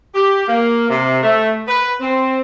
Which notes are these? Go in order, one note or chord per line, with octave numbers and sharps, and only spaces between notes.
G4
A#3
C3
A3
B4
C4